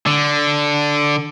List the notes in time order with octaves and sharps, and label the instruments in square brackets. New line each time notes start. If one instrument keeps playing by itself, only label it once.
[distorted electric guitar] D3